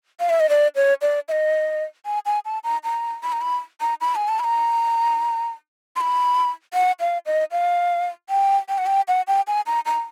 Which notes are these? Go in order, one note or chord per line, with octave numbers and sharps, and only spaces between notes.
F5
E5
D#5
D5
C#5
D5
E5
D#5
G#5
G#5
A5
A#5
A#5
B5
A#5
B5
A#5
B5
G#5
A5
B5
A#5
C6
B5
F#5
F5
D#5
F5
G5
G5
F#5
G5
F#5
G5
G#5
A#5
A#5